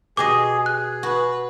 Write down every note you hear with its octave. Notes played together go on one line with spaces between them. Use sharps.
B2 G4 G#4 D#5 D6
G#4 F#6
F#4 B4